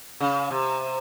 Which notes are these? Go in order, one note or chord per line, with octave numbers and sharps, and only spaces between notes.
C#3
C3